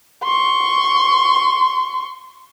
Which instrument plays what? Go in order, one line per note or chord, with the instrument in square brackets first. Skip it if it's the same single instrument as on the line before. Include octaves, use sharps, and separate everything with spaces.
[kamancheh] C6 C#6